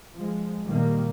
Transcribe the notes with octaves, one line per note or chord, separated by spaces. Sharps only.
F3 G#3
A#2 D#3 G3 A#3